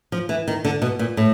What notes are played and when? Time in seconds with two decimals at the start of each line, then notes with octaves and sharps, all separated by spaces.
0.12 F3
0.29 E3
0.48 D#3
0.65 D3
0.82 B2
0.99 A#2
1.17 A2